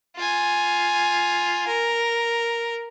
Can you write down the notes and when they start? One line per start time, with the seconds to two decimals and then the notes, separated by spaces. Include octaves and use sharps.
0.16 F4 G#5
1.68 A#4